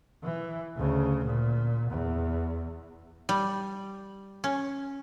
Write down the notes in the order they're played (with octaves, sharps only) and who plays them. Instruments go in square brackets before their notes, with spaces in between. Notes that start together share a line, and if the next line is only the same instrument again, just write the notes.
[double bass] E3
D2 C#3
A#2
E2
[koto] G3
C#4